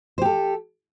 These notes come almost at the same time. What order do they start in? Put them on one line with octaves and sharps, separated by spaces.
C5 G4 A4